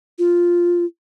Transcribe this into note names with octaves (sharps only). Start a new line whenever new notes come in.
F4